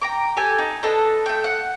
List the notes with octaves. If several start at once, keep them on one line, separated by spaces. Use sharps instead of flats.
G5 A#5 D6
G4 A4 G5 G#5
D#4
D4 A4 B4 D#5
A3 G5
F#5